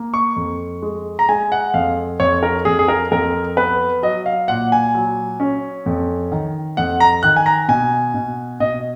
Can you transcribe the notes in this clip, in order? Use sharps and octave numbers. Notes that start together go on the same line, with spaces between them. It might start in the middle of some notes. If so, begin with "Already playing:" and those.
Already playing: A#3
C#6
F2
G#3
A#5
G#3 G#5
F#5
F2 F5
F2 C#5
A#4
F2 G#4
G#4
A#4
F2 A#4
B3 B4
F#3 D#5
F5
A#2 F#5
G#5
F#3
C#4
F2
D#3
F2 F#5
A#5
D#3 F#6
G#5
A#5
B2 G#5
B2
B2 D#5